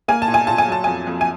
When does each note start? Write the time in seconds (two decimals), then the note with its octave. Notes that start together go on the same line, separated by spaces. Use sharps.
0.08 A#3 G#5
0.22 A5
0.28 A#2
0.34 G#5
0.47 A#2 A5
0.58 G#5
0.68 F#3 A5
0.84 F2 G#5
1.07 F2
1.21 G#5